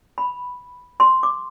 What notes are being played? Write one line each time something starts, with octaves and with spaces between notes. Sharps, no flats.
B5
C6
D6